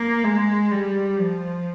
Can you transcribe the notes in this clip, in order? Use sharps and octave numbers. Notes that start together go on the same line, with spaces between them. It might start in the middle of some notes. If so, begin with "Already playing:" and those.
Already playing: A#3
G#3
G3
F3